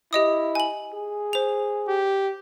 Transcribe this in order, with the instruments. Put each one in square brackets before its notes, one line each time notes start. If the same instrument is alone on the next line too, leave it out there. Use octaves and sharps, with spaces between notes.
[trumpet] E4 [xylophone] G4 D#5 D#6
[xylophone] G#5 F#7
[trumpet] G#4
[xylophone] C5 F7
[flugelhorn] G4